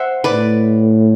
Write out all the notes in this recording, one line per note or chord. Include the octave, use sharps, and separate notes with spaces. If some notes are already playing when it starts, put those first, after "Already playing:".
Already playing: C5 E5 F#5
A2 B4 D5